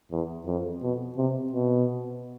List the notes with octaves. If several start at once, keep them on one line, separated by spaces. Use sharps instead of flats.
E2
F2
B2
C3
B2